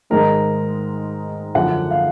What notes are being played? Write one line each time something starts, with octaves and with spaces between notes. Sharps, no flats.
G#2 D#3 G#3 D#4 A#4
F#2 D3 F3 F#5
F5